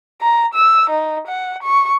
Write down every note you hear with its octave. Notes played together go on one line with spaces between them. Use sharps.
A#5
E6
D#4
F#5
C#6